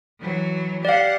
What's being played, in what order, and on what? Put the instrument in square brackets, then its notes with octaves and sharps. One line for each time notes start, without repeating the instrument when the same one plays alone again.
[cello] E3 F#3
[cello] G4 F#5 [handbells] D5 F5